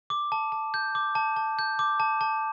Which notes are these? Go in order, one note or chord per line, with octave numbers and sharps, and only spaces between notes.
D6
A5
A5
G6
D6
A5
A5
G6
D6
A5
A5